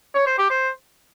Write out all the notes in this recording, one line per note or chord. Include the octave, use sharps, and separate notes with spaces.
C#5
C5
G4
C5